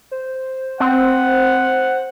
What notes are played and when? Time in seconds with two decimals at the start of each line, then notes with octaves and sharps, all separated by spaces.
0.11 C5
0.80 C4 F#5